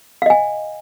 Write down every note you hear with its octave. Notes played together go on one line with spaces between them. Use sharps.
D#5 F5 G#5